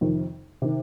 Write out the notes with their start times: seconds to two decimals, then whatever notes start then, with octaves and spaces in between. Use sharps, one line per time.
0.01 F2 C3 D#3
0.62 C3 D#3